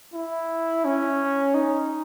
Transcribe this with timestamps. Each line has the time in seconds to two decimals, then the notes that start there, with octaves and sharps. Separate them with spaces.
0.14 E4
0.85 C#4
1.54 D#4